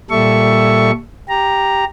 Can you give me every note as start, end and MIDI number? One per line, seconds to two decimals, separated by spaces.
0.10 0.91 46
0.10 0.91 55
0.10 0.91 69
0.10 0.91 76
0.10 0.91 85
1.29 1.85 67
1.29 1.85 82